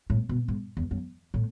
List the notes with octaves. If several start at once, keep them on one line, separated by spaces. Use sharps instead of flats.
A2
B2
G#2
E2
F#2
A2